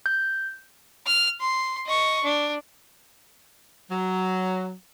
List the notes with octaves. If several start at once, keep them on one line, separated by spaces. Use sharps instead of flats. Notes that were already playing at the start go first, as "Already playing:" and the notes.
G6
F6
C6
D#5 C#6
D4
F#3